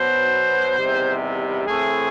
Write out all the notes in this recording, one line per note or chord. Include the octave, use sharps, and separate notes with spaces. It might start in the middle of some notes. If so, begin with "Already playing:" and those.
Already playing: B2 F#3 B3 C5
E2 C3 D#3 G3
A2 E3 A3 C4 G#4